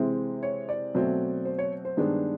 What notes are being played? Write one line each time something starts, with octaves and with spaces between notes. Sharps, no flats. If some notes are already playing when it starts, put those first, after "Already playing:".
Already playing: C3 E3 G#3 C4
C#5
D5
B2 F#3 A3 C4
C5
C#5
C5
G2 D#3 G#3 B3 D4